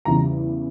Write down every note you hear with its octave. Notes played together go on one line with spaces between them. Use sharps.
E2 C#3 E3 G3 A#5